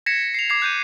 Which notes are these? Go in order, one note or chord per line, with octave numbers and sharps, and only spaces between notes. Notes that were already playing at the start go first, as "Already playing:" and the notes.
G#6 A#6 B6 C#7 E7
C7 F7
D6 G#6 C7
F#6 G6 D#7